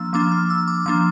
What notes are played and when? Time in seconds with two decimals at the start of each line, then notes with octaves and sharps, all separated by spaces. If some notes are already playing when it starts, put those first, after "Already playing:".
Already playing: F3 A#3 D4 E6
0.13 F3 A#3 D4 D6
0.32 F6
0.50 E6
0.68 D6
0.86 F3 A#3 D4 D6